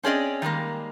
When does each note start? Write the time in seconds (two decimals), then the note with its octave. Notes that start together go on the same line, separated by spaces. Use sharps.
0.03 C4 C#4 G#4 D5 D#5
0.42 D#3 G3 G#3 A#3